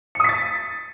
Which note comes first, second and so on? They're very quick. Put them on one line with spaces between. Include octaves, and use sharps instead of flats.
C#7 D#6 B6 A6